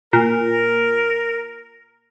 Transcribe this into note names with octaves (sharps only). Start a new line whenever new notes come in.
A#2 A#4